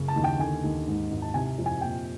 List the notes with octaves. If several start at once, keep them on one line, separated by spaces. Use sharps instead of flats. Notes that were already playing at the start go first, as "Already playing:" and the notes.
Already playing: F#1 C#3
A5
D#2
G5
D3 G#5
D#2
G#2
G#1
A5
C3 G#5
F2
G#5
A#2 G5